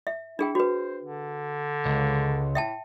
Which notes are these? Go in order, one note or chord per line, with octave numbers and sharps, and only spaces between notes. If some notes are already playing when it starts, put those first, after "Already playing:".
E5
D4 E4 G#4 G5
F#4 B4 C5
D3
C#2
A2 E5 G5 A5